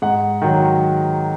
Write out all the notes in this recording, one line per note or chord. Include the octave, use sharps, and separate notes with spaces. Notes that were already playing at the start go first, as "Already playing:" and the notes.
G#2 F#5
D#3 F#3